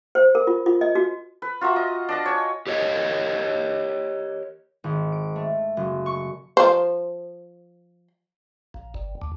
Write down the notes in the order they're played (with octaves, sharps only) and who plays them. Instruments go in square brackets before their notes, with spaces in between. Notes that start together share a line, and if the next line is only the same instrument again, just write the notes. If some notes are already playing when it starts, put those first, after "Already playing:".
[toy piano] C5
A#4
F4
F4
D#5
F#4
[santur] B4
F4 F#4 E5 A#5
D#5
D4 D#5 A5
C#5 G#5
[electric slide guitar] G4 A#4 C#5 D#5
[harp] G#1
D7
A3
F#1
C#6
[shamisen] F3 C5
[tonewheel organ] A#1
G1
D2